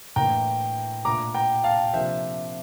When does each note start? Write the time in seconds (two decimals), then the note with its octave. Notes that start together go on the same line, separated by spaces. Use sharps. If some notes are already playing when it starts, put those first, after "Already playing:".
0.16 A2 E3 A#3 D4 G5 A#5
1.05 A#2 A3 D4 A#5 D6
1.34 G5 A#5
1.64 F5 A5
1.93 C3 F3 A#3 D4 C5 E5